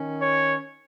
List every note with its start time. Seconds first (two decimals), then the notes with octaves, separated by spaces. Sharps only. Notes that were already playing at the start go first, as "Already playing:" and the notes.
Already playing: D#3 C#4
0.22 C#5